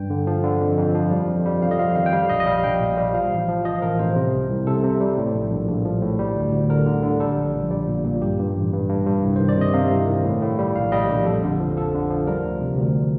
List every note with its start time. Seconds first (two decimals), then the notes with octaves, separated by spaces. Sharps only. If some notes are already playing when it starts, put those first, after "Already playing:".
Already playing: G2 G5
0.10 D3
0.27 F3
0.44 D3
0.61 F2
0.78 F2
0.94 F3
1.11 G3
1.28 F2
1.45 G3
1.62 F2 F5
1.71 D#5
1.79 F2 F5
1.96 D#3 F5
2.06 G5
2.13 G3 F5
2.29 A#1 D#5
2.40 D#5
2.46 G3 F5
2.64 A#1 G5
2.80 A#2
2.97 G3
3.14 F3 F5
3.31 A1
3.48 F3
3.65 F3 D#5
3.82 A1 A#4
3.99 A1 C5
4.16 C3
4.33 C2
4.50 C2
4.67 C3 A4
4.84 C3
5.00 G3
5.18 A2
5.35 A#1
5.51 A#1
5.68 A#1
5.85 F3
6.02 A2
6.19 G3
6.36 D2
6.52 D2
6.70 D3 A#4
6.86 D3
7.03 D3
7.20 G3 A4
7.37 A#1
7.54 A#1
7.70 G3
7.88 A#2
8.05 A#2
8.22 G2 G4
8.39 G2
8.56 A1
8.72 G2
8.89 G2
9.06 G2
9.23 C2
9.36 D#3 C5
9.49 D5
9.57 C3 D#5
9.74 C3 F5
9.90 C2
10.08 D#3
10.24 A2
10.42 A2
10.59 G3
10.75 A#1 F5
10.92 G3 D#5
11.09 A#1 G4
11.26 F2 A4
11.43 D3
11.60 F3
11.76 F3 A4
11.94 D3
12.10 F3
12.27 G3 A#4
12.45 D2
12.61 C3
12.78 D2